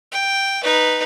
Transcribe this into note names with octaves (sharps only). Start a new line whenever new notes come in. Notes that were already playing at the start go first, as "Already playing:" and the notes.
G5
D#4 B4